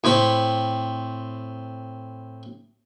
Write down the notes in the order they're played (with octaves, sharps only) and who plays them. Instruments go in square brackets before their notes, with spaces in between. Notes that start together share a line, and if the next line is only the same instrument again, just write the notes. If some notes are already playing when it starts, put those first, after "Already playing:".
[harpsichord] A2 C4 B5